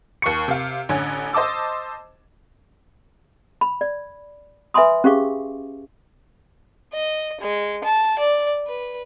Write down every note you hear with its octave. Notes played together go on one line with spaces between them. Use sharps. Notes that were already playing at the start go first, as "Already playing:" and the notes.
D#2 C#6 C#7
C3 F5
A1 D3 C#4 G#6
C5 D#5 A5 D6 E6
B5
D5
B4 E5 G#5 B5 C6 D#6
C#4 G4 G#4 F5 C#6 D6
D#5
G#3
A5
D5
B4